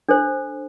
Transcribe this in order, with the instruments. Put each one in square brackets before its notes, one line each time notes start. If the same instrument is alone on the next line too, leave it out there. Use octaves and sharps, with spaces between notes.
[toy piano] D4 A4 C5